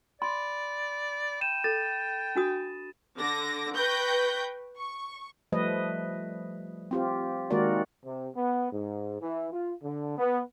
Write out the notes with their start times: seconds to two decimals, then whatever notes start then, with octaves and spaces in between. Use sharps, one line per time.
0.22 D5 B5 C6
1.41 G5 D#7 E7
1.64 A4 A6
2.35 D4 F#4 D#6
3.17 D3 D6 A#6
3.76 B4 G5 C#6 G6 A#6
4.77 C#6
5.52 F3 G3 A3 B4 D#5
6.91 C4 F4 G4
7.50 D#3 G#3 A#3 F#4 A#4 D5
8.05 C3
8.35 B3
8.72 G#2
9.21 E3
9.53 F4
9.83 D3
10.18 B3